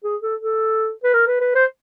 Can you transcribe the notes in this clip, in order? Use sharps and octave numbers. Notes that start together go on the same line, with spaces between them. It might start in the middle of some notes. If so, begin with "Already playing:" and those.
G#4
A4
A4
B4
A#4
B4
B4
C5